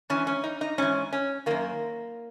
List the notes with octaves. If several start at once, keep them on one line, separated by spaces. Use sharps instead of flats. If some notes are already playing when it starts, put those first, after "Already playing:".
G#2 E3 C#4
C#4
D#4
D#4
G#2 E3 C#4
C#4
F#2 D#3 A#3